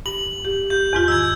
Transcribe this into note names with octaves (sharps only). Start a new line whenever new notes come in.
G2 F#7
G4
G4 G6
E2 G#2 F4
F#2 D#3 E6 G#6